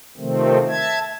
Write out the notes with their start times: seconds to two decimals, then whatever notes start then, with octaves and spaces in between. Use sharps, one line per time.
0.17 C3 D#3 F3 A3 C4
0.69 E5 A5 G#6